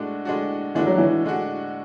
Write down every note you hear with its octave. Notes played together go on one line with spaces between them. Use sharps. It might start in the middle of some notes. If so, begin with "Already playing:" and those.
Already playing: A2 G#3 D4 F#4
A2 G#3 D4 F#4
A2 E3 G#3 D4 F#4
F#3
E3
A2 G#3 D4 F#4